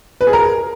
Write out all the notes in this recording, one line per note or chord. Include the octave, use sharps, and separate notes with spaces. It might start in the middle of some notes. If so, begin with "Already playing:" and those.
B4
G#4
A#4